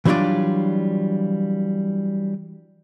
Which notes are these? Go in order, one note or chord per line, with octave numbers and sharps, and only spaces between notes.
E3 F#3 G3 D4 F4 D5